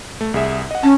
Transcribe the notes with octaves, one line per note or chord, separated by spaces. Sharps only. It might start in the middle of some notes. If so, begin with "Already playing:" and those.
A3
C2 G#4 E5
D#5 F#5
C#4 A5